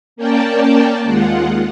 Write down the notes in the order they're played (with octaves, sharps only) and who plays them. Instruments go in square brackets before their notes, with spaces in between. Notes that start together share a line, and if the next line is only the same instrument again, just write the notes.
[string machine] A#3 C#4 A#4 D5 G5 A5
D#2 G#3 F4 F#5